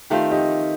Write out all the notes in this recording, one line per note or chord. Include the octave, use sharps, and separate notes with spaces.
D#3 A3 C4 F4 G4
D#4 G4